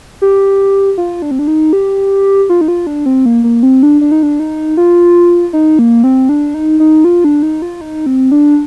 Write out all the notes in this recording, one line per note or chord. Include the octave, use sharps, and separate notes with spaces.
G4
F4
D4
C4
D4
D#4
G4
F4
D#4
F4
D4
C4
A#3
A#3
C4
D4
D4
D#4
D4
D#4
F4
D#4
A#3
C4
D4
D#4
D#4
F4
D4
D#4
F4
D#4
C4
D4